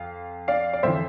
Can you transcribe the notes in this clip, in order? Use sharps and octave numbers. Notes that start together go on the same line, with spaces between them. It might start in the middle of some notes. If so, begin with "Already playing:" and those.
Already playing: F2 F5
D5 F5
D5
F2 E3 C5 E5